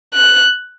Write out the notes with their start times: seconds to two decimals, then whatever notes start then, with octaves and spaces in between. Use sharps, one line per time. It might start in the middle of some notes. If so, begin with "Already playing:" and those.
0.14 F#6